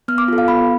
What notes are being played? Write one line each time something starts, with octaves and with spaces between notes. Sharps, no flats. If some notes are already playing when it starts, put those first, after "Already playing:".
B3 F6
D6
F4 A4
F5
B3 B5